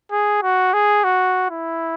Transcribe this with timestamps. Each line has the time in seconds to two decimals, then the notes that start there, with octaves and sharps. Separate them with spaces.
0.11 G#4
0.43 F#4
0.74 G#4
1.04 F#4
1.50 E4